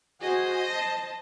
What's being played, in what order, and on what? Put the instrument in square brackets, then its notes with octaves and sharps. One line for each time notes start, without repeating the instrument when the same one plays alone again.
[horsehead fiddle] F#4 G#4 [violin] C5 D#5
[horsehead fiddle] A5